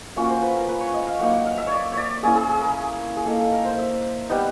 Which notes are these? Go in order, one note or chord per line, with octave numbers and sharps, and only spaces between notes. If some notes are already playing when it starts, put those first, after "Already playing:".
A#3 C#4 F4 F#4
C5
B4
A#4
B4
C#5
D#5
F5
F#3 A#3 D#4 F#5
F#5
F5
E5
C#5 D5
C#5
D5
A#3 C#4 E4 G#4
G#4
G#4
A#4
G#4
A#3 D#4 A4
A4
A#4
C5
E5
G3 B3 D#4